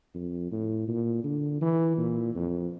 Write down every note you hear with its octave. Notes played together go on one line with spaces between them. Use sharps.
F2
A2
A#2
D3
E3
A#2
F2